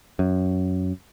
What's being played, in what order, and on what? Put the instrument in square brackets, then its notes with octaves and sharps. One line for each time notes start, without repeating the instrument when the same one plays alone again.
[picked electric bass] F#2